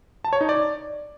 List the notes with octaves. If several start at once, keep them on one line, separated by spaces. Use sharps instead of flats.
A5
C#5
D#4
D5